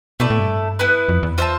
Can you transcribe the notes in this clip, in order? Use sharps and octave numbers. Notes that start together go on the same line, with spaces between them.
B2 A3 E4 A4 D5
A2
G2
B3 E4 B4
F2
E2
F4 C5 E5 A5